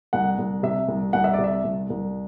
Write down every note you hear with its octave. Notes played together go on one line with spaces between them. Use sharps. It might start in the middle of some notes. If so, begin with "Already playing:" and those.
C2 F#5
C2
C3 E5
C2
C2 F#5
E5
C3 D5
E5
C2
C2